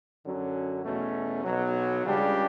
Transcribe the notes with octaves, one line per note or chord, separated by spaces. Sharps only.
F#2 D3 F#3 C#4
E2 B2 A3 C#4
B1 B2 F#3
C#2 C#3 G3 D4 G4